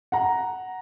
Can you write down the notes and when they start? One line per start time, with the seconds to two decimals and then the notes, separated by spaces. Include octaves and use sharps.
0.12 F#5 A#5